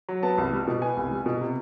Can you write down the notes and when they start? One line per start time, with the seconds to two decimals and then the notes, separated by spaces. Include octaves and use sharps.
0.09 F#3
0.23 B3 A5
0.38 C2
0.53 G3
0.67 B2
0.82 B3 G#5
0.97 C2
1.11 G3
1.26 B2
1.41 C3